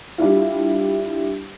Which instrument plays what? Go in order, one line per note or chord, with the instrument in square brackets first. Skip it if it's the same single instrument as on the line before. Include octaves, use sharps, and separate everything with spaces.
[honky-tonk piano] G3 D4 E4 F4